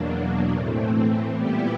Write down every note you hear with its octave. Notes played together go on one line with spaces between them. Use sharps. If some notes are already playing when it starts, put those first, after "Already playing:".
Already playing: E2 B2 F#3 A#3 D4
A2 E3 A3 C4
A#2 G3 B3 E4 G4